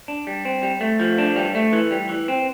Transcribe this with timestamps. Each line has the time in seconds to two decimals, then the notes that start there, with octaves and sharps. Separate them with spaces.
0.08 D4
0.27 G3
0.45 C4
0.63 G3
0.81 A3
1.00 F3
1.18 D4
1.36 G3
1.55 A3
1.73 E3
1.91 G3
2.09 E3
2.28 C4